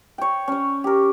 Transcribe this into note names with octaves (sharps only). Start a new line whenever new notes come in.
C#5 G5
C#4 C#5
G4 A#4